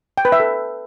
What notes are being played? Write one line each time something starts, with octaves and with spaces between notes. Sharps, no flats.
G5
B4
E5
A4